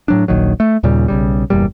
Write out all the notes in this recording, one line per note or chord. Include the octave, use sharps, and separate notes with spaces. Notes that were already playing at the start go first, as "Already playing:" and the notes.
A2 F#3 D4
D#1 A#1 D#3 F#3
A3
D#2 A#2 C#3 G3
B1 C#3 G3
G1 E2 A#2 G3